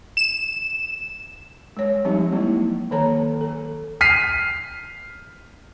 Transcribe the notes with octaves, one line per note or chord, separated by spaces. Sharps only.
E7
G#3 C#5
F3 G3 G#3 C4 D#4 G4
F#3 A#3 C4 E4
D#3 A#3 A4 C#5 A5 A#5
A4
F6 B6 C7 D#7